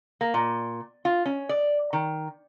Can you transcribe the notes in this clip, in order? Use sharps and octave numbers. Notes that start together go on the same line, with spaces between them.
A#3
A#2
F4
C#4
D5
D#3